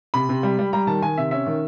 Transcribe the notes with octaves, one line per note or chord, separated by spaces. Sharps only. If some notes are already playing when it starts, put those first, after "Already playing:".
C3 B5
C3
G3
G3
G3 A#5
D#3 A5
D#3 G#5
C3 E5
C#4 E5
D#3